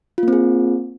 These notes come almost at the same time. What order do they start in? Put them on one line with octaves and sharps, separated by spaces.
F4 A#3 C4 G#4